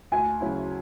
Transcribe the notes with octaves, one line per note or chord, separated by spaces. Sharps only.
D2 G#5
C#3 F#3 C#4 E4